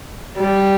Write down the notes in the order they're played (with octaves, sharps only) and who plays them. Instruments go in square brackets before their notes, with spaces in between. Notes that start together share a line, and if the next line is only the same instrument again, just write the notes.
[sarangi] G3